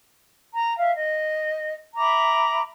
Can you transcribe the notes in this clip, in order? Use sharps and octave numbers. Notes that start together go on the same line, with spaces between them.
A#5
E5 F5
D#5
E5 A#5 B5 D6